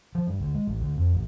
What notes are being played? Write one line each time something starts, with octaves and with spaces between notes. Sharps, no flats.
F3
G2
D2
G#3
A1
D2
F2
A1